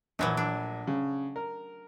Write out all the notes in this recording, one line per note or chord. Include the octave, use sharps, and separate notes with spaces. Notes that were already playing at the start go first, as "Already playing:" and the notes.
A#1 E3 F#3 A3
D4
C#3
A#4